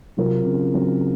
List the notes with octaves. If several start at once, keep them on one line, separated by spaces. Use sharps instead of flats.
C3 F#3 C4 F4 A#4
C#3
F#3 C4 F4 A#4